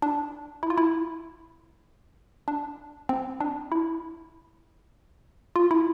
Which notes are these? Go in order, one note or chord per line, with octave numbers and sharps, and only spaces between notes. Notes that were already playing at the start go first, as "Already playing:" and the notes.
D4
E4
F4
E4
D4
C4
D4
E4
F4
E4